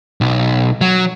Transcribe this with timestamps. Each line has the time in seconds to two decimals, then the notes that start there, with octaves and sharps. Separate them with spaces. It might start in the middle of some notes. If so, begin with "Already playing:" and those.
0.21 B1
0.81 F#3